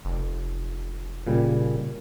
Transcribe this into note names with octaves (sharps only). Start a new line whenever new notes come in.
F1
A#2 C#3 G3